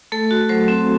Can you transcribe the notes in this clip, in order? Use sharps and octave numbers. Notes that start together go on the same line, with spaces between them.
A3 A4
F#4
F#3 C5
C4